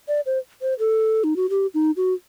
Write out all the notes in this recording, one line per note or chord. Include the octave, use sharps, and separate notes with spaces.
D5
C5
C5
A4
D#4
F#4
G4
D#4
F#4